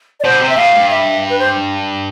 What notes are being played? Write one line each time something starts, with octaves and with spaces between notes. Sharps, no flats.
D5
B2 C5
D3
C3
E5
A2 F5
G2
E5
B4
C5